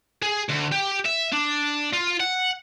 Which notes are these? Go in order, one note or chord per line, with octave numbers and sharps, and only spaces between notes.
G#4
D2
G4
E5
D4
F4
F#5